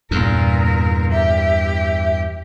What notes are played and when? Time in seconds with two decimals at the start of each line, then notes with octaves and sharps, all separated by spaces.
0.11 E2 G2 A#2 A#4
1.12 G4 E5